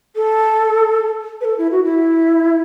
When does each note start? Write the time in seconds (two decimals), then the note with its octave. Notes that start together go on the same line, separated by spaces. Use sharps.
0.15 A4
1.40 B4
1.45 A4
1.58 E4
1.71 F#4
1.84 E4